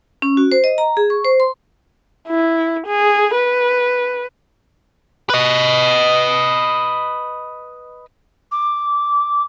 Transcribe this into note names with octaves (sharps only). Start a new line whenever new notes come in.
C#4
F#4
C5
D#5
A#5
G#4
C#6
C5
C6
E4
G#4
B4
B4 D#5
D6